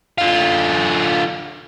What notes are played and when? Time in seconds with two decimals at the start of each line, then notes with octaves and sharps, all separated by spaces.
0.18 D3 F4